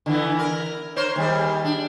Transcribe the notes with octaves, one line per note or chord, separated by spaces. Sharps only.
D3 E3 B3
A#4
A#4 C5 C#5
D#2 G3 G#4
D4